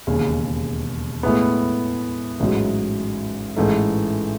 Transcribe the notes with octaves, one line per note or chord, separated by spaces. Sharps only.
E1 D#2 C#3
A2 G#3 B3
A1 G#2 F#3
A1 G#2 E3 A3